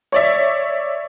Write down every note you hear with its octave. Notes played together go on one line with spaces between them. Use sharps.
C#5 D5 E5